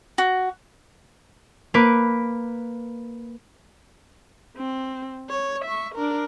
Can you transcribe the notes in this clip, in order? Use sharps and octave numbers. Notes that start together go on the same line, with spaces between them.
F#4
A#3 B4 D6
C4
C#5
E5 C#6
D4 A#4